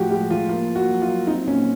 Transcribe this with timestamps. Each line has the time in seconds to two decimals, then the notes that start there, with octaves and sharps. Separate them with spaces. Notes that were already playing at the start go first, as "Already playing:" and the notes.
Already playing: A2 F3 F#4 G4
0.10 G#3 G4
0.30 F3 F4
0.49 A#3 F4
0.69 A#3
0.75 F#4
0.89 F#3
1.02 F4
1.09 F#3
1.27 C4 D#4
1.46 A#2 C#4